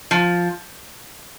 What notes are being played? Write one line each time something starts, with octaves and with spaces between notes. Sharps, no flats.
F3